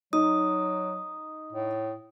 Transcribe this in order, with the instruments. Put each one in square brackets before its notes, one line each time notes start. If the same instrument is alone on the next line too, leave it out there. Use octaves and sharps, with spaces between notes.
[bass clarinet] F#3 [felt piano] D#4 [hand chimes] D#6
[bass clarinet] A2